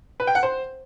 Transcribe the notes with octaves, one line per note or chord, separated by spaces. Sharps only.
B4
G5
F#5
C5